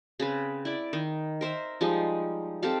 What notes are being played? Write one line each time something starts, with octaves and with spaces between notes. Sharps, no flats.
C#3 C4 B4
E4 D5
D#3
A#4 C5 E5
F3 G3 G#3 D#4
C4 G4 A4 F5